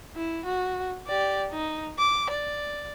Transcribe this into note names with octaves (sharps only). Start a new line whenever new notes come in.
E4
F#4
G4 D5
D#4
D6
D5